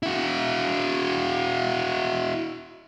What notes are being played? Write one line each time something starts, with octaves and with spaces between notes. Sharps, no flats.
E4 F#4